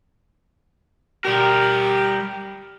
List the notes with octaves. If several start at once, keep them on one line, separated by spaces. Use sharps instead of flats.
G3 G4 A#4